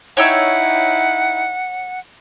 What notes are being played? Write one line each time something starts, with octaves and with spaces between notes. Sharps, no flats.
D#4 E4 C#5 F#5 G5 E6